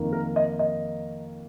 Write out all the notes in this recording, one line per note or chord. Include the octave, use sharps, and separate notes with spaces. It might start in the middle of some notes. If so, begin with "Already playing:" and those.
Already playing: F2 D#3 A#3
A#4
D#5
D#5